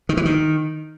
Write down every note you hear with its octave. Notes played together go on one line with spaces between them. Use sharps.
D#3
E3
D#3